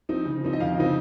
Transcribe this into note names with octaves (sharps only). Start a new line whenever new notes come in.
F3 C4 D#4
C#3
F3 C4 D#4
D#5
F2 F5
C#3 F3 C4 D#4